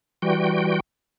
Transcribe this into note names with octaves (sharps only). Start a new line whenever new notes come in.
E3 G3 F#4 G5